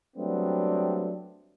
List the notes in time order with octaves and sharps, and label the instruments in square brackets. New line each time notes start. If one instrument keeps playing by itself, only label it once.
[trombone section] F#3 G3 A3 B3 C4 D4